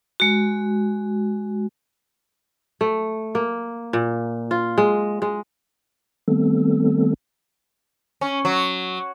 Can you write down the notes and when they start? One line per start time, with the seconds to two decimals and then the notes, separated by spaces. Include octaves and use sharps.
0.20 G#3 F#4
2.81 A3
3.35 A#3
3.93 A#2
4.51 F4
4.78 G#3
5.22 G#3
6.28 D#3 G3 A3 B3 C4 A4
8.21 C#4
8.45 F#3